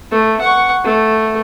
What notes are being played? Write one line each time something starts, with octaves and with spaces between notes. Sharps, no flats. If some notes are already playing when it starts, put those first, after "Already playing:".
A3
F#5 C#6
A3